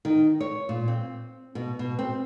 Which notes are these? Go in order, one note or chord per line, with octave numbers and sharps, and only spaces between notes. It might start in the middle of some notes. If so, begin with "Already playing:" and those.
D#3
C#5
A#2
C4
B2
B2
C4